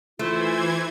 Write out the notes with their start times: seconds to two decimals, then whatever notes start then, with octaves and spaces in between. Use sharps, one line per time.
0.19 E3 A3 E4 F4 C5 G#6